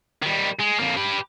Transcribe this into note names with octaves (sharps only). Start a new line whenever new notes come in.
D#3 G3
G#3
F2 A#3
G4 B4